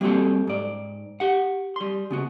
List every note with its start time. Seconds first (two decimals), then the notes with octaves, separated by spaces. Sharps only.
0.01 G3 A#3 C4 F#4 G4 A4
0.47 G#2 D5
1.20 G4 F#5
1.76 G3 C6
2.11 C#3 B3 F#4